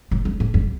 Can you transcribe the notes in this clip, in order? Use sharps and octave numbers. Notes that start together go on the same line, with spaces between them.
A2
F#2
A2
F#2